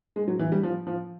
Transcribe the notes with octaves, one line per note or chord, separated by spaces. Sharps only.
G#3
F#3
E3
G3
F3
F3